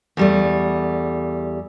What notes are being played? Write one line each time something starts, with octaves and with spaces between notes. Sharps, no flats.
E2 G3 A3